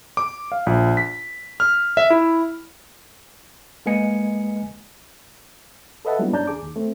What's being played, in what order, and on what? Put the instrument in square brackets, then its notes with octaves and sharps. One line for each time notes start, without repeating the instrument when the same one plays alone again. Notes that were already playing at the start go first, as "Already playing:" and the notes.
[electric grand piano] D6
F5
A#1
B6
F6
E5
E4
[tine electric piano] G#3 A#3 B4 D#5 G#5 C#7
[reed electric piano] A4 B4 D#5 E5 F#5 A5
F#3 G3 A#3 B3 D4 E4
G2 C#4 D4 A5 A#5 G6
D#2 G#4 D6
D#2
A3 C4